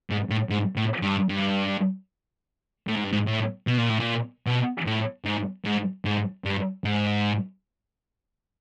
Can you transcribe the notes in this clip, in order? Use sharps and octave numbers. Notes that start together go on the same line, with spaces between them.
G#2
A2
G#2
A2
G2
G2
A2
G#2
G2
G#2
A2
B2
A#2
A2
A#2
B2
A2
G#2
G#2
G#2
G2
G#2